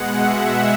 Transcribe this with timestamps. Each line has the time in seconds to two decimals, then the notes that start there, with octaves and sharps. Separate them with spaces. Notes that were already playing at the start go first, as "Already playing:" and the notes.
Already playing: B2 G#3 F#5
0.16 E5